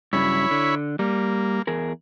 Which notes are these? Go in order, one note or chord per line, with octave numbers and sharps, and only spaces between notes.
G2 C#3 F#3 E4 C#5 B5
D3
G3 A#3
E2 G#4 A#4